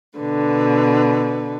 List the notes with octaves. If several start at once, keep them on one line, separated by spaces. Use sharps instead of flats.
B2 D3 B4